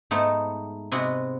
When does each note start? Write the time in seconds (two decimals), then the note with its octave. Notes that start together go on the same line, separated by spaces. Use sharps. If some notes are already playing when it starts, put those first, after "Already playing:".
0.11 G#2 A3 B3 D#4
0.92 C3 G#3 B3 F#4